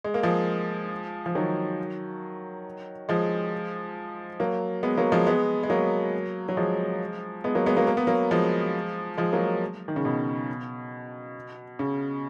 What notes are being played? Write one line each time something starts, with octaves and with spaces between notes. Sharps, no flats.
G#3
A#3
F3 G#3
F3
D#3 F#3
F3 G#3
F#3 A#3
G#3 B3
F#3 A#3
F3 G#3
G#3 B3
G#3
F#3 A#3
F#3
F3 G#3
G#3 B3
F#3 A#3
G#3 B3
F#3 A#3
A#3
B3
F#3 A#3
F3 G#3
F3 G#3
F#3 A#3
D#3
C#3
B2
C#3